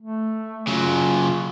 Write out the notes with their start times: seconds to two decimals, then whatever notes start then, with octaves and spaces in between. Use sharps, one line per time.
0.02 A3
0.67 C#3 F#3 F4